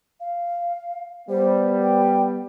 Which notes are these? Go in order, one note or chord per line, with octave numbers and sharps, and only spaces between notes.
F5
G3 B3 C5
G5